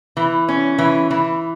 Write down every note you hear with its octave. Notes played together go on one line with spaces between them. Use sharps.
E3
C#4
E3
E3